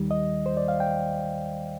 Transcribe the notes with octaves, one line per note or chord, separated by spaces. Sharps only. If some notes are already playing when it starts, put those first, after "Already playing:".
Already playing: D#2 D#3 G3
D#5
C5
D5
F5
G5